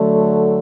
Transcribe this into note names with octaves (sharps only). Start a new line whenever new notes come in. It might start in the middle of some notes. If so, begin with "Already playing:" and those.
Already playing: D3 F#3 A3
A4